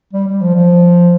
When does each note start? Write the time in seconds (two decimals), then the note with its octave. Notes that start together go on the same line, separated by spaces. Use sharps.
0.13 G3
0.28 G3
0.41 F3
0.55 F3